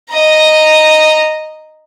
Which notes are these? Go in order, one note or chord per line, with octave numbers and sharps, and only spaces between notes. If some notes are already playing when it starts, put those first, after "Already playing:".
D#5 A#5